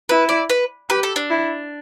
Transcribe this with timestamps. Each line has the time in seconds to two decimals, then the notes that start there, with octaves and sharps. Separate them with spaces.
0.09 E4 B4
0.29 D5
0.50 B4
0.90 G4 B4
1.03 A4
1.16 D4
1.30 E4